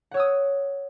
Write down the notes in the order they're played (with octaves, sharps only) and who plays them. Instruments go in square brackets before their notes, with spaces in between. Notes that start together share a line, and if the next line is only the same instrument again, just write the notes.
[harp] F#5
C#5
E6
D#6